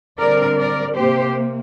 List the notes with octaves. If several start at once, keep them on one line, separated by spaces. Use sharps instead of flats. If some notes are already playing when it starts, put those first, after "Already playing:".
D3 G3 C4 A#4 D5
A#4 D5
C3 A#3 G4 C5